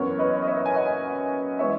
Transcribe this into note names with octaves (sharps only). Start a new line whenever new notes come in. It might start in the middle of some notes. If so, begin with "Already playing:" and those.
Already playing: F#2 E3 B3 A#4 C#5
B4 D#5
D#5
C#5 E5
G#5
D#5 F#5
E3 G#3 B3 C#5 E5